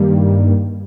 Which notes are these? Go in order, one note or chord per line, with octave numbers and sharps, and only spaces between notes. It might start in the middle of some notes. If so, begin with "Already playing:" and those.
Already playing: G2 D#3 G3 A#3